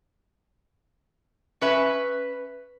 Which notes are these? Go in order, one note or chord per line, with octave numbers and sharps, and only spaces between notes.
C#4 B4 E5